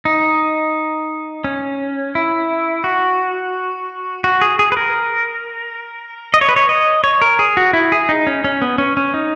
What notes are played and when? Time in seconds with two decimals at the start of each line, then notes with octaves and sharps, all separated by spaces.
0.05 D#4
1.44 C#4
2.15 E4
2.84 F#4
4.24 F#4
4.41 G#4
4.59 G#4
4.72 B4
4.77 A#4
6.34 D#5
6.41 C#5
6.49 B4
6.56 C#5
6.69 D#5
7.04 C#5
7.22 A#4
7.39 G#4
7.57 F#4
7.73 E4
7.92 G#4
8.09 D#4
8.27 C#4
8.44 C#4
8.62 B3
8.78 C#4
8.97 C#4
9.14 D#4